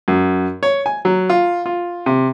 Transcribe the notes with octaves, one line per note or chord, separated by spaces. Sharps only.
F#2
C#5
G#5
F#3
F4
F4
C3